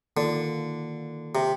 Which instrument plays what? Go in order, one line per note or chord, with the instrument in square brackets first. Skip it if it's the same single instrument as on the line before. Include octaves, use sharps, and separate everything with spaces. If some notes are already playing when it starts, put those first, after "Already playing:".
[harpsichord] D3 [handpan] D#3 A#3 F4
[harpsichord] C3